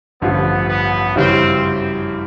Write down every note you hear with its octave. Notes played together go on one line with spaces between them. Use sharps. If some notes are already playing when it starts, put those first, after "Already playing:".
A1 G2 D3 F3 B3
B3
F#2 C#3 E3 G3 C4